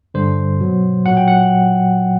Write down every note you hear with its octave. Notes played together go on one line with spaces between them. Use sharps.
G2 D3 G3 C5
B2 F#3
A#2 F#3 F#5
G5
F#5